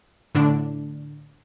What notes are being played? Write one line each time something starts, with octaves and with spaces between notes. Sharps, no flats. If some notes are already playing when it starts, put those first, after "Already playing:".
A2 D3 D4